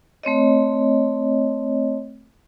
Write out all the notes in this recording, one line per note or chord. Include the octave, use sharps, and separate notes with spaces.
A3 C4 C#5 D#5